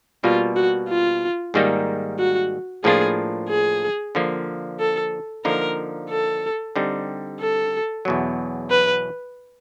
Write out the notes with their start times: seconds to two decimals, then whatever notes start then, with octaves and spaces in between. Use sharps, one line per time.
0.24 B2 G3 A#3 F4
0.56 F#4
0.89 F4
1.54 G#2 D#3 G3 A#3 D#4
2.19 F#4
2.84 A2 F3 A#3 D4 F4 G#4
3.49 G#4
4.15 D3 F3 A#3
4.79 A4
5.45 D3 F3 A#3 D#4 A#4
6.10 A4
6.76 D3 G3 C4 D#4
7.40 A4
8.05 E2 B2 F#3
8.71 B4